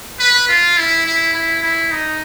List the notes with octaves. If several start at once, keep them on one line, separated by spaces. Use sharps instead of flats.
B4
F4
E4
E4
E4
E4
D#4